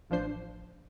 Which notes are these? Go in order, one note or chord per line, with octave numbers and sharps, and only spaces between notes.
A1 F3 D4 C5 C7